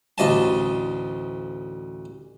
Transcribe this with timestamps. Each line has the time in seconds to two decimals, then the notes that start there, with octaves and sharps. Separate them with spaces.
0.18 A1 D2 D#5 A5